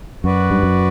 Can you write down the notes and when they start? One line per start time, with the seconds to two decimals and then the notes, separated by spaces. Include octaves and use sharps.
0.24 F#2 F#4 B4 D5
0.51 G2
0.63 F#2